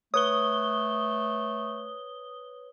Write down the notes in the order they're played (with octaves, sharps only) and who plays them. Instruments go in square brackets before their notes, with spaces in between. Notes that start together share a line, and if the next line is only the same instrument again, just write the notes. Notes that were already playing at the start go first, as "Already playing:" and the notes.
[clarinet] A3 [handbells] B4 C#5 [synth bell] D#6 G7